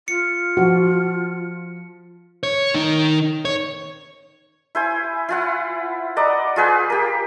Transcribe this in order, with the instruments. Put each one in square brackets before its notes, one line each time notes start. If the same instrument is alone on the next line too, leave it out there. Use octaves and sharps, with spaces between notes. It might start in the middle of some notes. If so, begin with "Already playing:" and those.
[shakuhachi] F4 [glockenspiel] C#7
[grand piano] F3 [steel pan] F#4
[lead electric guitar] C#5
D#3 D#4
C#5
[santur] E4 C5 G#5
E4 F4 F#5
D5 D#5 F#5 A#5
F4 G#4 B4 G5
G4 A#4